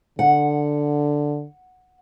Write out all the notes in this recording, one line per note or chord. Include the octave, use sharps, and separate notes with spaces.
D3 F#5